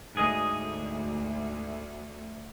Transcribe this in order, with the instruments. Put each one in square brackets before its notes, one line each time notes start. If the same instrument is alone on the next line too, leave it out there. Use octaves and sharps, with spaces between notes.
[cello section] D2 [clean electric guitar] G#2 G#4 D#5